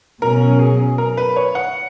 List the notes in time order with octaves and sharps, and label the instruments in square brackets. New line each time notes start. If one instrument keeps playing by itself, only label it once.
[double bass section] B2 F#3 C#4 [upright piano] A#4
[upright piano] G#4
A#4
B4
C#5
F#5